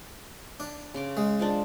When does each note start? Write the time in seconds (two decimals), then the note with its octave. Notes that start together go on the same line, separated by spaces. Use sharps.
0.60 D4
0.94 C#3 C6 D6
1.17 G#3
1.39 D4 F4 C5